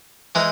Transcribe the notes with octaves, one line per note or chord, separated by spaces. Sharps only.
E3 G#3 D#4